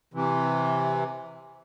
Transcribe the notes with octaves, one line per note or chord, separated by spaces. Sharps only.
C3 E3